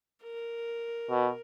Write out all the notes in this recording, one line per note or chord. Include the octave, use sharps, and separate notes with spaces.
A#4
B2